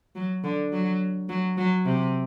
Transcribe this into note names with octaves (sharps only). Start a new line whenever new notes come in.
F#3
D3
F#3
F#3
F#3
C3